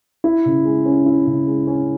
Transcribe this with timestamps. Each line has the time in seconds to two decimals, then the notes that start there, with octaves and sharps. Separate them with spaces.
0.24 E4
0.45 C#3
0.65 G#3
0.85 C#4
1.06 E4
1.26 C#3
1.47 G#3
1.67 C#4